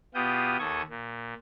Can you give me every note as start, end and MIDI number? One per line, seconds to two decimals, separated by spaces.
0.14 0.57 47
0.14 0.57 59
0.14 0.57 65
0.14 0.57 67
0.14 0.57 87
0.14 0.57 91
0.59 0.82 39
0.59 0.82 69
0.59 0.82 85
0.59 0.82 87
0.59 0.82 92
0.90 1.34 46